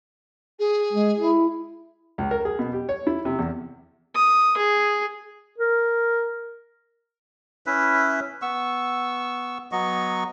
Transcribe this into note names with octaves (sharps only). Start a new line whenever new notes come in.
G#4
G#3
E4
C#2
A#4
G#4
B2
G4
C#5
E4
C3
E2
D#6
G#4
A#4
C#4 E4 B4 E5
B3 C#6 E6
F#3 B3 D#5 C#6